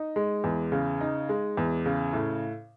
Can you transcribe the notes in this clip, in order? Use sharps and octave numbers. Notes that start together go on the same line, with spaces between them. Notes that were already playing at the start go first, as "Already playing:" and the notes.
Already playing: D#4
G#3
E2
C#3
D#4
G#3
E2
C#3
A2